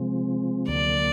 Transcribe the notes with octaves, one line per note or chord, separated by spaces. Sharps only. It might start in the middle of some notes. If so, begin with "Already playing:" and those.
Already playing: C3 F3 G#3 C4
D2 D3 F#3 A#3 D5